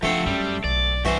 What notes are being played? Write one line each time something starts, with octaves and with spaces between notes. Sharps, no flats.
F3 A3 C4 D4 F#5
F#2 G3
B1 D5
G2 E3 F#4 C5